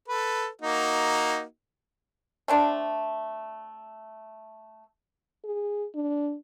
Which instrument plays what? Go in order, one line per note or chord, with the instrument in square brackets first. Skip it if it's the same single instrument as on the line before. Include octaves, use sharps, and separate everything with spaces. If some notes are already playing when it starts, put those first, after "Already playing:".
[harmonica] A4 B4
A#3 D#4 F#4
[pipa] A3 C4 D4
[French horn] G#4
D4